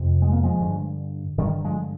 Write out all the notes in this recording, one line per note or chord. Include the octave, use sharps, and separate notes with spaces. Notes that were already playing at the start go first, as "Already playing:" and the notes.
Already playing: F2 C3
G#3
A#3
F3 G#3
G2 D3
G2 D3 D#3 G3
F3 G#3